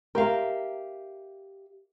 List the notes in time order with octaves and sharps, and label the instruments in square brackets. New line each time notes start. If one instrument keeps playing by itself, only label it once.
[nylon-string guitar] G4 E5 F5 [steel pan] A#4